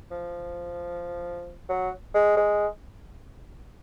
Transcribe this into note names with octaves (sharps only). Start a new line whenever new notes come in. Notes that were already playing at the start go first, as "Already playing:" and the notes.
F3
F#3
G#3
G#3